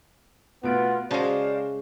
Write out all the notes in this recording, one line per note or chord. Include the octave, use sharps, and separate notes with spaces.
B2 A3 B3 F4 D7
C#3 G#3 F#4 C5 D5 F5 A5